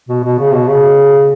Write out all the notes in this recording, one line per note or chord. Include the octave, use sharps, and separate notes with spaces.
B2
B2
C#3
B2
C#3